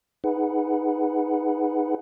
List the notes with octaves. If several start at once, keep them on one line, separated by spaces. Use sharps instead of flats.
D#4 G#4 B4 F#5